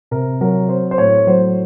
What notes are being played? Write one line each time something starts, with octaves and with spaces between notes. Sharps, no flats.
C3 A#4
F#3 A#4
C4 C5
C5
A2 C#5
F#3 C5